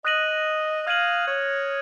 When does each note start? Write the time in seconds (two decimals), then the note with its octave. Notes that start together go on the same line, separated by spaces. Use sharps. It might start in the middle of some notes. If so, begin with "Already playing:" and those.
0.04 D#5 D#6 F#6 A#6 D#7 F#7
0.87 F5 F6 G#6 D#7 F#7
1.27 C#5